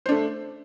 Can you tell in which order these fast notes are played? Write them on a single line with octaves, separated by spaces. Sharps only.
C5 D4 A3